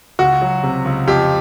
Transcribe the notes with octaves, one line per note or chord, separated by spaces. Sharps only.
C#2 F#4
F#3
C3
C#2
F2 G4